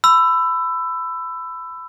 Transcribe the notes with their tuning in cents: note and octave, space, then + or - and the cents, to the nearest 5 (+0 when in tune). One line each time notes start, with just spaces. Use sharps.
B5 +25 E6 +15